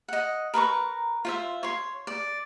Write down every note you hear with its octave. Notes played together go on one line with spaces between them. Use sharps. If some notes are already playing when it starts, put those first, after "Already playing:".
D#5 F#5
A#4 B4 A#5 C#6
F4 C5 E5
C#5 C6
D5